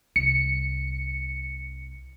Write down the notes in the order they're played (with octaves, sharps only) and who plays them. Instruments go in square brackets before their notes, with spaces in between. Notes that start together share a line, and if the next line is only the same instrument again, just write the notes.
[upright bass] C2 [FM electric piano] C#7